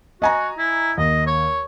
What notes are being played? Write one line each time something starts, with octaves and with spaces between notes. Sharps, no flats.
F#4 D#5 G#5 A#5
E4
D#2 D#5
C#5